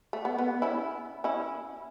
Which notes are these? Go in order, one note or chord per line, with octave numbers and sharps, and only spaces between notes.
A3
B3
B3
C#4 E4
C#4 E4